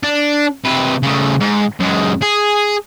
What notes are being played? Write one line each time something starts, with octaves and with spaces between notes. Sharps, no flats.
D4
C3 B4
C#3 A3
G#2
F#2 G#3
G#4